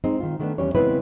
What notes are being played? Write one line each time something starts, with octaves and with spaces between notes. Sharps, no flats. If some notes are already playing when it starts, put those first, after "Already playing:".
G#3 C4 D#4
D#3 F4
D#3 A3 B3 C#4 D4
E2 G3 C#4 C#5
C#3 G#3 B3 C4 E4 B4